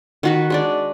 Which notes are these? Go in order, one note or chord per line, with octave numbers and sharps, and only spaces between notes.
D#3 F#4 B4
G#3 D4 D5